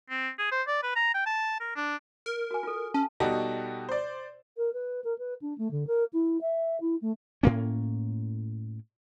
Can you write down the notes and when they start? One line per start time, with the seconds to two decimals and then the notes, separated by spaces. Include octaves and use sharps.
0.10 C4
0.38 G#4
0.51 C5
0.67 D5
0.83 B4
0.96 A#5
1.14 G5
1.26 A5
1.60 A#4
1.76 D4
2.26 A#4
2.51 F#4 G#5
2.63 F4 A4
2.94 C#4 A5
3.20 B2 G3 D#4 F#4 G4 A4
3.89 C5 D5
4.57 A#4
4.73 B4
5.04 A#4
5.18 B4
5.41 D4
5.58 A3
5.71 D3
5.87 A#4
6.13 E4
6.41 E5
6.81 E4
7.02 A3
7.43 A2 A#3 C#4